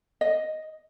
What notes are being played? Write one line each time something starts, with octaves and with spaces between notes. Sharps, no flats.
D#5